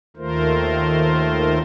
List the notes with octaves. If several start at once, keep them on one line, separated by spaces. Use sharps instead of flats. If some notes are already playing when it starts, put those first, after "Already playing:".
D#2 D#3 A3 F4 A#4 C5